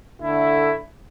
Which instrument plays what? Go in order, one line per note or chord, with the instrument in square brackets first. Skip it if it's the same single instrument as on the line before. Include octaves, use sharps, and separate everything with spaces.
[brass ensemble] D3 A3 E4